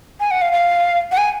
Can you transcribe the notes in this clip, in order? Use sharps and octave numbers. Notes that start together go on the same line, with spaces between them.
G#5
F#5
F5
F5
F#5
G#5